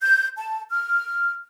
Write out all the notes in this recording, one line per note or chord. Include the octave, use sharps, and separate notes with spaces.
G6
A5
F6